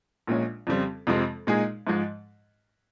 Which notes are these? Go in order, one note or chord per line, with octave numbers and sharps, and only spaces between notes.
A#1 A#2 G#3 C#4
F2 C#3 G3 C4
F2 C3 F3 G#3 C4
A#2 G#3 D#4 G#4
G#2 F3 G#3